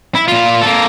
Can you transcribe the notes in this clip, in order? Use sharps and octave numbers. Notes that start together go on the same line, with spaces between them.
E4
A#2 F4
A#3 A4